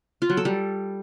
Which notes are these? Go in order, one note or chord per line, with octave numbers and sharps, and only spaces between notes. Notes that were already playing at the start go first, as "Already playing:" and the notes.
F4
F#3
A4
G3